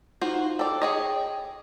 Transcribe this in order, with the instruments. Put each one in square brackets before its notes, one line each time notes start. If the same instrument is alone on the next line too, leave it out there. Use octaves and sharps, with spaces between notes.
[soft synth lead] D#4 [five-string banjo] F4 F#4 C5
[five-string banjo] A4 D5 [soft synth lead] G5
[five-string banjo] G#4 C#5 D#5